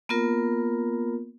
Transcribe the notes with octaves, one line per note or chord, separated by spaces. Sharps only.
A#3 B3 F4 A#4